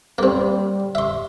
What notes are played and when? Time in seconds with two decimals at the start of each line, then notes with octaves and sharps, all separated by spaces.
0.18 G3 A#3 C4
0.95 E5 C6